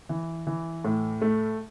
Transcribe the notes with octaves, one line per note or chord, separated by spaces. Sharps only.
E3
E3
A2
A3